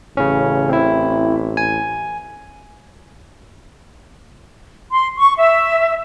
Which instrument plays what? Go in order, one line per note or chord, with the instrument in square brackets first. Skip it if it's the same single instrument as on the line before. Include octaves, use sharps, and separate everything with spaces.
[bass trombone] A1 [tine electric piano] C#3 C#4
[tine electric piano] C4 E4
G#5
[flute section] C6
C#6
E5